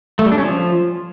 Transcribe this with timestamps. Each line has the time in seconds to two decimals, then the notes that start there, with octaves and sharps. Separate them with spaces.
0.19 A3
0.25 G3
0.32 D4
0.38 C#4
0.44 F3